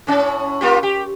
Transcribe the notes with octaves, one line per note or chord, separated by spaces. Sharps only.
A2 C#4
A#3 F4 G4
G4